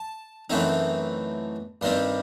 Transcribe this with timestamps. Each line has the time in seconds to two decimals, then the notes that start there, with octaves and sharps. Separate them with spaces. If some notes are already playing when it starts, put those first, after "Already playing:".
Already playing: A5
0.50 F#2 E3 A3 C4 D#4
1.81 G2 D#3 G3 C4 C6